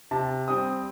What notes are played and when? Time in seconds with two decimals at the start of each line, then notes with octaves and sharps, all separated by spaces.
0.11 C3 A5
0.48 G3 C4 D#6